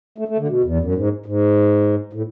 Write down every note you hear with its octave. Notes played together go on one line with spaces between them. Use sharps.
A3
A3
D3
B2
E2
F#2
G#2
G#2
A2